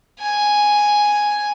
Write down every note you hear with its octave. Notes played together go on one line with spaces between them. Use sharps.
G#5